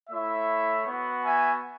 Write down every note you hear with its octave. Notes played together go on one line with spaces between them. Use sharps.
A3 E4 C#5 E5
B3
F#4
E5 G#5